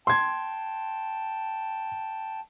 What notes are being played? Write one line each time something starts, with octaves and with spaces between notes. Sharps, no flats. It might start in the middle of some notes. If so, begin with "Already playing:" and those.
G5 A5 C6 G#6